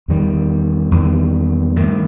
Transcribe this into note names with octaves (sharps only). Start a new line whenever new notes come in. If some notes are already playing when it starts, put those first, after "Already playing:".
E2 D#3 G3
E2 D#3 G3
G2 D#3 A3